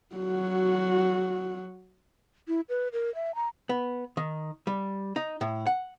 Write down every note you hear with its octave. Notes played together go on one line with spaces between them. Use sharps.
F#3 F#4
E4
B4
A#4
E5
A#5
B3
D#3
G3
D#4
A2
F#5